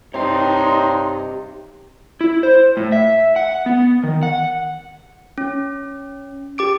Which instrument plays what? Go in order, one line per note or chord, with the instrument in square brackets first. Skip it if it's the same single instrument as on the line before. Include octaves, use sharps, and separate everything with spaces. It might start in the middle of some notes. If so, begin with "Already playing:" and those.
[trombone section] G2 D#4 [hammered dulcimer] C3 [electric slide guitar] C#5 G5 [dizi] C6
[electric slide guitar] E4
C5
A2
E5
F#5
B3
D#3
F#5
[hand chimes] C#4
G4 D6 D7